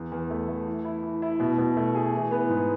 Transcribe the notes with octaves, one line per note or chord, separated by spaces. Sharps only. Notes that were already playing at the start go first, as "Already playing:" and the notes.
Already playing: E2
E2
A3
A3
E3
E4
E3
E4
B2
B2
A3
G#4
E3
B3
G#2